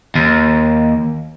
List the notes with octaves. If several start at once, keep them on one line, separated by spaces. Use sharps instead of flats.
D#2